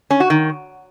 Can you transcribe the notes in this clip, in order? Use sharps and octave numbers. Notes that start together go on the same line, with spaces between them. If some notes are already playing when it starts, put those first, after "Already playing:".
C#4
F#4
D#3